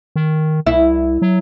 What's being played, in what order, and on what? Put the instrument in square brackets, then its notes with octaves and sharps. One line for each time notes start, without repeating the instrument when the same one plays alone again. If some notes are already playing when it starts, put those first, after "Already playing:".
[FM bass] D#3
[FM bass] C2 [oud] E4
[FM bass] F#3